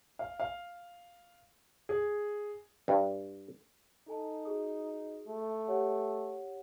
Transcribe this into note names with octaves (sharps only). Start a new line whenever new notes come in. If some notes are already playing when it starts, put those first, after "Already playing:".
F5
F5
G#4
G2
D#4 A4 G#5 A5
F#4 G#4 D#6
A3
G4 C#5 F#5